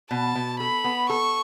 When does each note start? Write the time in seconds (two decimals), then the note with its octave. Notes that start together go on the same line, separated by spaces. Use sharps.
0.11 B2 A5
0.35 B2
0.59 A4 B5
0.84 B3
1.09 A4 C#6